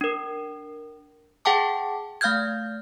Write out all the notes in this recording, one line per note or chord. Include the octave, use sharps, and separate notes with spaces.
D4 A#4
G#4 F#5 G5 A5 D6
A3 F5 F6 G6 G#6